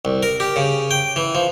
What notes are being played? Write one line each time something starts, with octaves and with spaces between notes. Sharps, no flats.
C2
A#4
G4
C#3
G5
E3
F3